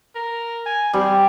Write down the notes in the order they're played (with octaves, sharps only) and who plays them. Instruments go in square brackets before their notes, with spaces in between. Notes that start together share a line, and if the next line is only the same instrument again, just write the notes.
[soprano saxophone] A#4
G#5
[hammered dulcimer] G3 [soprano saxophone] C4